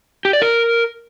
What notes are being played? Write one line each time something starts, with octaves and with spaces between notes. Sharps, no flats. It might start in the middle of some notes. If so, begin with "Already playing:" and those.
G4
D5
A#4